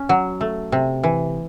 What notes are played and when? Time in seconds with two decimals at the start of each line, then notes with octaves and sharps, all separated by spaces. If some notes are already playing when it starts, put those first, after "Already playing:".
Already playing: C#4
0.09 F#3
0.41 A3
0.72 C3
1.03 E3